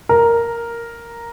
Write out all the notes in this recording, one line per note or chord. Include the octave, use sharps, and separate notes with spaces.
A#4